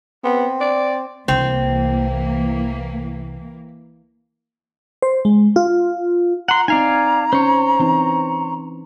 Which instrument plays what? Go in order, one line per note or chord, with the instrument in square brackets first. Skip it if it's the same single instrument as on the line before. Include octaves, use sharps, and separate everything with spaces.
[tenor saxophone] B3 [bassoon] C4
[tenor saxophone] D5
[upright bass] C2 [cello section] E3 A#3 [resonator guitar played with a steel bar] C4
[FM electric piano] C5
G#3
F4
[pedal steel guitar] F#5 C6 [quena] A#5
[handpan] C4 D#4 [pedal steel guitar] D5 F5 G#5 [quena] A#5
[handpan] C#4 [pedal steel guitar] C5 C#5
[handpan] E3 C4 D#4